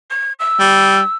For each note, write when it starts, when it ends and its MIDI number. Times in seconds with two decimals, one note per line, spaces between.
0.10 0.33 92
0.39 1.16 88
0.60 1.00 55